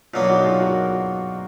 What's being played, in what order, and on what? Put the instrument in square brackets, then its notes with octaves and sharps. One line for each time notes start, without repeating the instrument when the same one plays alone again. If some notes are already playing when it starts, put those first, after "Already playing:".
[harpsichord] B2 F#3 A#3 [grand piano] D4 F4
[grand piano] F4
D#4 F#4
F4 G#4
F#4 A#4